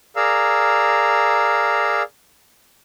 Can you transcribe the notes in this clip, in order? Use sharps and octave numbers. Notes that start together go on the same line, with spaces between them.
G#4 A#4 D5 F5 A#5 E6